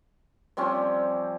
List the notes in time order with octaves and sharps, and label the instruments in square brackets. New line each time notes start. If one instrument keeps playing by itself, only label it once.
[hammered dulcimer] F3 G3 C4 C#4